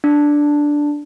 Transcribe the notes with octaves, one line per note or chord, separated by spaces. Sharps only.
D4